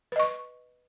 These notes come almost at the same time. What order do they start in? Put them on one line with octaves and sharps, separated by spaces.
B4 D#5 C#6